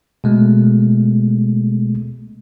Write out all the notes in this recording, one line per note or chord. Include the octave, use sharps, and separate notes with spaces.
B2 G#3 A3